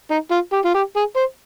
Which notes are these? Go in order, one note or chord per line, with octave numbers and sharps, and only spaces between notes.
D#4
F4
G4
F4
G4
G#4
C5